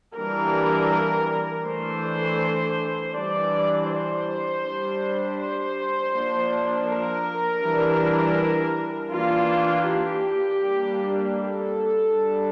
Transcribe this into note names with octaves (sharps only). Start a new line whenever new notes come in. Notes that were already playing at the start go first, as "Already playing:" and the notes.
E3 G3 A#3 D4 A#4
E3 A3 D4 C5
E3 G3 D4 D5
C5
G3 D4
C5
F3 A#3 D4
A#4
E3 G3 D4
E3 A#3 D4 F4
G4
G3 A#3 D4
A4
G3 D4